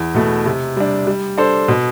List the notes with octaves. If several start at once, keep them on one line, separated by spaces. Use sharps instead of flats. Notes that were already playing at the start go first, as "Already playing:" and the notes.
Already playing: E2
B2 A3
C3
G3 D4
G3
D4 A4 C5
B2